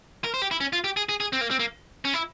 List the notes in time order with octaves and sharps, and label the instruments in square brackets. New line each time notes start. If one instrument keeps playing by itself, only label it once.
[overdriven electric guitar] A#4
C5
G4
E4
C#4
F4
G4
G#4
G#4
G#4
C4
A#3
C4
A#3
C#4
E4